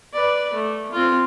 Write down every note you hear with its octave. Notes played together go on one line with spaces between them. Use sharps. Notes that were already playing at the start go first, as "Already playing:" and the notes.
B4 D5
A3
C4 F4